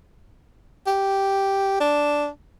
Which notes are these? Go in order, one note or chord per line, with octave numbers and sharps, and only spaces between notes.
G4
D4